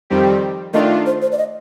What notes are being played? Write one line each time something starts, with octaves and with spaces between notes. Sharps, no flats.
F2 D#3 G3 C4 G4
D#3 A3 D4 F4 D#5
C5
C5
D5
D#5